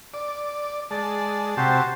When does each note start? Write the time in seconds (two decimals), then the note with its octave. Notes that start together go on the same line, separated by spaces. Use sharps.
0.14 D5
0.91 G#3 D5 A5
1.57 C3 F#4 G4 C5 A5